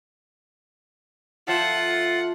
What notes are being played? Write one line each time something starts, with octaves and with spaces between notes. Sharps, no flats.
F3 A3 F4 C5 E5 F#5